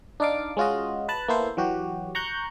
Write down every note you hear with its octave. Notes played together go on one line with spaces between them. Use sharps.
D4 D#4 D5 F5 D6
G#3 C#4 F4 F#4 D#5
B4 A5 F#6
A#3 B3 E4 A4 C5
E3 F#3 F#4 G4
A#5 C#6 F#6 G6